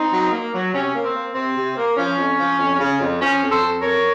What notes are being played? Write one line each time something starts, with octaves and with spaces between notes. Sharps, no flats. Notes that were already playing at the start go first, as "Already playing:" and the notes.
Already playing: C4 D#4
F#3
A#3
F#3
C3 C#4
A#3
C4
A#3
C3 C4
C3
A#3
F3 C#4
F2
F3
F2
C#3
F2
F3 C#4
F2
A4 C5
F2
F2 A#4 C#5